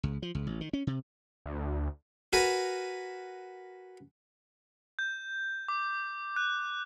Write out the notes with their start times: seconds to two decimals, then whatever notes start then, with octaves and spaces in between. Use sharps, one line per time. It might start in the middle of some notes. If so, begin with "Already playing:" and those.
0.03 C#2
0.22 F3
0.35 C#2
0.47 A1
0.61 D#3
0.73 C#4
0.87 C3
1.46 D2
2.33 F#4 A#4 B4 G#5
4.99 G6
5.68 D6
6.36 F#6